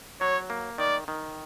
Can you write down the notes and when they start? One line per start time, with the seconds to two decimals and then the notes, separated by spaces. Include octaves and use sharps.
0.21 F#3 C#5
0.50 A#3
0.78 D#3 D5
1.08 D#3